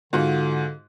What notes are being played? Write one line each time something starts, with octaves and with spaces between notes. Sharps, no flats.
G#2 D3 F4 F#4